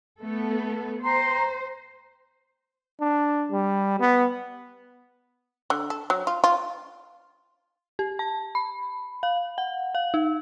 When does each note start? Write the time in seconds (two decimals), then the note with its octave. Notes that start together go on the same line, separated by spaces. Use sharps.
0.21 A3 B3 A4
1.03 C5 G5 A#5 C6
3.01 D4
3.52 G3
4.00 B3
5.70 D3
5.90 A4
6.10 F#3
6.27 F4
6.44 F4
7.99 G4
8.19 A5
8.55 B5
9.23 F5
9.58 F#5
9.95 F5
10.14 D#4